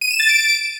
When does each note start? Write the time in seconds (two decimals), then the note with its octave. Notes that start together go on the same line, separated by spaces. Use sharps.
0.01 D#7
0.11 E7
0.20 A6
0.29 D7